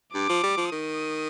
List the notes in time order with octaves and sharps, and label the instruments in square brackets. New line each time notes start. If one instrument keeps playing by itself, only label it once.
[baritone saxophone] G2 [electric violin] D6
[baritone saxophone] F3
G3
F3
[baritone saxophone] D#3 [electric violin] D#6